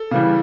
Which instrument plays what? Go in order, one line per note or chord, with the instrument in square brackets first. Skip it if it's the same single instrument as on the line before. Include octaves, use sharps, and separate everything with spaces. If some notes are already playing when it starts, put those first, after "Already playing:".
Already playing: [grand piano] A4
C#3 E3 G3